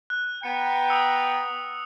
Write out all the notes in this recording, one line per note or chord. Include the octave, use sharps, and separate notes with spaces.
F#6
B3 G5 A#5 C#7
D#6 E6 C#7